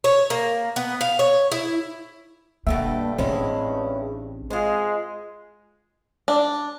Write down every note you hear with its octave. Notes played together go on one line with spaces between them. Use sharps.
C#5
A#3
B3
F5
C#5
E4
G2 B2 A3 A#3 E5 G5
A1 G#3 C4 C#4 E4
G#3 F4 C5
D4